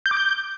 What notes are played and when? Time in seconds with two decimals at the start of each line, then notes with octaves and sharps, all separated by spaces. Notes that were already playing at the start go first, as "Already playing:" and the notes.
0.06 G6
0.11 D6
0.17 G6